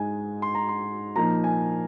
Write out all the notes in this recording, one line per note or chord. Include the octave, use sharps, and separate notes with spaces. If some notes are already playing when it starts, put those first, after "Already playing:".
Already playing: G#2 G#3 D#4 G#5
C6
A#5
C6
A#2 F3 A#3 D#4 A#5
G#5